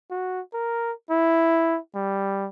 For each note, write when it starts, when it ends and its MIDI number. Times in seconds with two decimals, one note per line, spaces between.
0.11 0.41 66
0.54 0.93 70
1.11 1.79 64
1.95 2.49 55